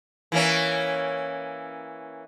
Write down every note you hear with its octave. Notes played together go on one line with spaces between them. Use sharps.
E3 A#3 C#4